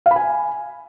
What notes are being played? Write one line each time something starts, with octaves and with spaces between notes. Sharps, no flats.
F5
B5
G#5